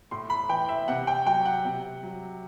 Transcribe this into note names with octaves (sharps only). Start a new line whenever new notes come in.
A2 C6
B5
E3 G5
E5
C3 F#5
G5
F#3 G5
F#5
C3
F#3